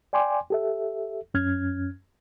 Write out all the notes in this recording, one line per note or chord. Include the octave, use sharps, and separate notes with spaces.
D5 G5 G#5 C6 D6
G4 A4 E5
F#2 C#4 F6 G#6